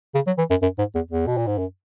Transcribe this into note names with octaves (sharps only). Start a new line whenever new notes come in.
C#3
F#3
E3
F#2
F#2
G#2
E2
E2
B2
A#2
G#2
F#2